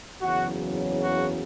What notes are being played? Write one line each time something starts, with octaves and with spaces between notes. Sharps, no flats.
F#1 E2 C#3 F#3 F#4
F#4